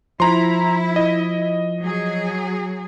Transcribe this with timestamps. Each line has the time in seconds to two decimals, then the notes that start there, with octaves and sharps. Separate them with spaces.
0.20 F3 E4 A#5 C6
0.96 D#5
1.80 F#3 G#4